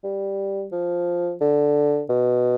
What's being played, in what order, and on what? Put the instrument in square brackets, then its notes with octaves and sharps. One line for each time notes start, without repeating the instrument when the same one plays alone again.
[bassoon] G3
F3
D3
B2